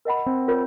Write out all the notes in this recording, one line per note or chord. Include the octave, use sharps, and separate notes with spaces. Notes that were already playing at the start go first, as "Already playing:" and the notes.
A#4 D#5 F#5 B5
C4
F4 A#4 C#5